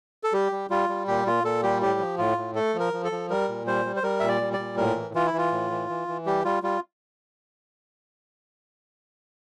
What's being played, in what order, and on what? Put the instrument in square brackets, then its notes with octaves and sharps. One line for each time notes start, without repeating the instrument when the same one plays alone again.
[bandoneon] A4
G3 G4
G3
G3 F4
G3
A#2 G4
A#2 F4
A#2 A4
G3 G4
A2 G4
F3
A2 F4
A2
A3 A4
F3
A#4
F3
A4
F3
G3 A#4
A#2
G3 C5
G3
C5
G3 A#4
A#2 E5
D5
G3
D5
A#2
A2 A#4
E3
E3 F4
E4
E3 F4
A2
E3
E3
E3
G3 G4
G3 F4
G3 F4